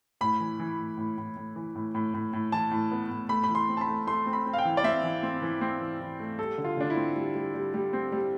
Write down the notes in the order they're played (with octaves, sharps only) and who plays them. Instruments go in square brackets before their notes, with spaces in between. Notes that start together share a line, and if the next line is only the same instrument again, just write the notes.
[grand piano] A2 B5
E3
E3
A2
A2
A2
A2
E3
A2
A2
A2
A2
E3 A5
A2
B3
A2
A3 B5
B5
E3
C6
C4
A5
B5
A3
A3 C6
C4
B5
C4
F5
G5
E3
D5
C4 E5
E3
C4
E3
C4
E3
E3
A3
G3 A4
D3
F4
D3 D4
E4
C4
G3
G3
G3
G3
C4
G3